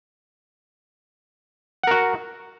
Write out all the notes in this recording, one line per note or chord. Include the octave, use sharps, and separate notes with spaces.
F#4 A#4 F#5